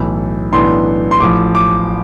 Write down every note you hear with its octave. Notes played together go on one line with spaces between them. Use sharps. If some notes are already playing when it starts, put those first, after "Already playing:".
Already playing: B1 A2 E3
B1 A2 E3 B3 D4 C6
C6
A1 A2 F3 D6
D6